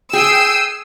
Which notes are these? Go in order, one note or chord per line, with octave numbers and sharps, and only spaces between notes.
G#4 G5 E6 C7 D#7